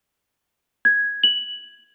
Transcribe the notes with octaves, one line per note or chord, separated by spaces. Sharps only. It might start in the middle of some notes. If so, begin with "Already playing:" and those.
G#6
F#7